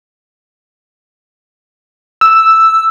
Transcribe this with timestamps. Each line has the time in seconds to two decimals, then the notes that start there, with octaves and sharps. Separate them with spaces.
2.21 E6